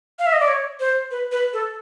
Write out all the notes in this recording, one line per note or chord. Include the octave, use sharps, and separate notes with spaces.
F5
E5
D#5
D5
C#5
C5
B4
B4
A4